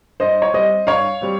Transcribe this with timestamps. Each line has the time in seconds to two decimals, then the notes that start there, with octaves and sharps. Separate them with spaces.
0.20 G2 C5 D#5
0.42 C#5
0.54 G3 C4 C5 D#5
0.87 G2 C#5 F5
1.21 G3 C4